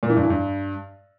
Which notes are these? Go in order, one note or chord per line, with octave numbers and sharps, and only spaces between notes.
A#2
E3
G2
E3
G2